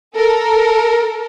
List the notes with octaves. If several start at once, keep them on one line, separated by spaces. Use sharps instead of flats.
A4 A#4